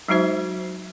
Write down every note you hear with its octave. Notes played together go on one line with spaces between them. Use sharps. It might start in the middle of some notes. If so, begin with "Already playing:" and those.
F#3 G#3 D#4 F#4 C5 E5